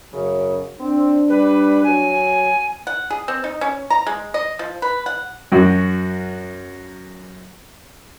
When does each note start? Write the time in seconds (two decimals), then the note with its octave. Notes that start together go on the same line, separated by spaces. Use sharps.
0.14 F#2 C#3
0.80 C4 D4
1.29 G3 B4
1.84 F#3 G#5
2.87 F#5
3.10 G#4
3.28 C4
3.44 D#4
3.61 C#4
3.90 A#5
4.07 G#3
4.34 D#5
4.59 F3
4.82 B4
5.06 F#5
5.52 F#2 F#4